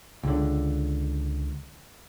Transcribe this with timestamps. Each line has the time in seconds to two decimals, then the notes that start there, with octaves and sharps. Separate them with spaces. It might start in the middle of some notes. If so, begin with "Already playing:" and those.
0.23 C#2 D3